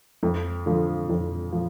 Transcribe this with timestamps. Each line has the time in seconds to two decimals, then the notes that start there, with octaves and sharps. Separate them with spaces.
0.23 F2
0.66 D3 F3
1.09 F2
1.52 F3